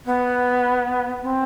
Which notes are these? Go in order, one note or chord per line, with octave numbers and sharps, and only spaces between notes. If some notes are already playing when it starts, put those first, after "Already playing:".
B3
C4